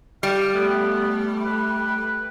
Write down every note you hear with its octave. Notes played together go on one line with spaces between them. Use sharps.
G3 F5
A3 B3
B4